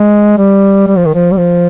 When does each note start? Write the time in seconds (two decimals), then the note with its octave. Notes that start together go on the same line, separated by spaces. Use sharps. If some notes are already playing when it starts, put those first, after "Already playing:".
Already playing: G#3
0.38 G3
0.87 G3
0.96 F3
1.06 D#3
1.14 F3
1.32 G3
1.37 F3